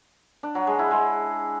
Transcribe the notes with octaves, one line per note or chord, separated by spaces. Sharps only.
D4
F#3
G#3
E4
G#3